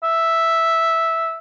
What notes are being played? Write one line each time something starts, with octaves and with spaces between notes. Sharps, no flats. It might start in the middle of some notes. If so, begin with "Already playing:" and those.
E5